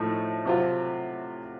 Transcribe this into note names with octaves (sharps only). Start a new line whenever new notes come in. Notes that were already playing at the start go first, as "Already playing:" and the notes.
Already playing: A2 F3 A3 D#4
C3 F#3 C4 F4